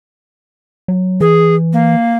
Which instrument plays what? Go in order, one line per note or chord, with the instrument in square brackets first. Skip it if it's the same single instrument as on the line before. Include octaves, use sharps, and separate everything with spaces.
[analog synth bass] F#3
[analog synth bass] E3 [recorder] G#4
[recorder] A#3